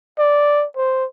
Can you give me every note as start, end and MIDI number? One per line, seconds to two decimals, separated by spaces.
0.18 0.65 74
0.76 1.06 72